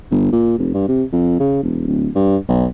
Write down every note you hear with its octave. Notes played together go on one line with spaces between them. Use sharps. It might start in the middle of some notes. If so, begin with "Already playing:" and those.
G1
A#2
F1
G2
C3
F2
C#3
E1
D1
G2
B1